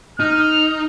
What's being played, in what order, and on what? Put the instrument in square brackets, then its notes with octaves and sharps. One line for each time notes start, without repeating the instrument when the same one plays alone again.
[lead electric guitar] D#4 [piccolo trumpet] F6